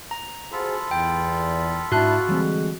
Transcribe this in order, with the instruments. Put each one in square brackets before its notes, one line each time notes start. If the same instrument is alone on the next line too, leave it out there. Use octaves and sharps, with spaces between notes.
[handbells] A#5
[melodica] F4 A4 B5 [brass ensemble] F#4 G#4 C5
[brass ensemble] E2 [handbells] G5
[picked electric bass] G#2 [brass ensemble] D4 E4 A5 [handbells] F#4 F#6
[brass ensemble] D3 G#3 G#4 [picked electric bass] E3 G3 C4